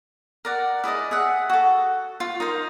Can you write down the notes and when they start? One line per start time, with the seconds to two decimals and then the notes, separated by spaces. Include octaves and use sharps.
0.45 A#4 D5 F#5
0.84 E4 G#4 D5 D#5
1.11 G#4 E5 F#5
1.50 F#4 A4
2.20 F4
2.40 D#4 A#4 C5